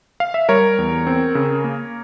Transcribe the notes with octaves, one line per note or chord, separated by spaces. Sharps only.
F5
E5
G3 A#4 C#5
E2
C4
C#3
A#3